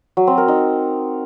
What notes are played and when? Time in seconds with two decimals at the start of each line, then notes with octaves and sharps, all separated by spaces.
0.17 F#3
0.27 C4
0.38 A#4
0.48 D#4